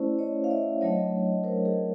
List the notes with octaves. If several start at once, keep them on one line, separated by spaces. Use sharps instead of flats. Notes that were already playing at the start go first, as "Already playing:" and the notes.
Already playing: A3 C#4 E4 C5 D5
C#5 D#5
F5
D5 E5
F#3 A3 D4 C#5 D#5
A#4 C5
G#4 A#4